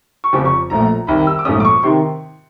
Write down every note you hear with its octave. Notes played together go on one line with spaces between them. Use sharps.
C#6
F1 F2 C#3 F3 D6
C#6
A#1 A2 F3 A3 A#5
C2 C3 D#3 B5
E6
D6
A#1 G#2 F3 A3 C#4 D#6
D6
C#6
C3 D#3 C6